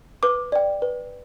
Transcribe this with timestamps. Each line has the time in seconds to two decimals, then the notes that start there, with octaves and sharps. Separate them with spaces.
0.23 B4 D6
0.52 D5 G5
0.82 B4